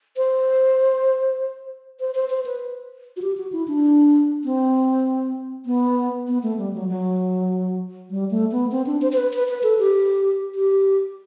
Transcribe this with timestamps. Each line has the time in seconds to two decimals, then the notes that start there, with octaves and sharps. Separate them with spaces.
0.17 C5
2.00 C5
2.15 C5
2.30 C5
2.46 B4
3.17 F#4
3.22 G4
3.37 F#4
3.52 E4
3.68 D4
4.44 C4
5.66 B3
6.28 B3
6.43 A3
6.58 G3
6.74 F#3
6.89 F#3
8.10 G3
8.31 A3
8.52 B3
8.72 C4
8.86 D4
9.02 C5
9.12 C5
9.17 B4
9.33 B4
9.48 B4
9.63 A4
9.79 G4
10.55 G4